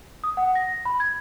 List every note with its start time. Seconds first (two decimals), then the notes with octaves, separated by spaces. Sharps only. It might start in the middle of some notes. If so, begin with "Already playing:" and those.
0.24 D#6
0.37 F#5
0.55 A#6
0.85 B5
1.00 G#6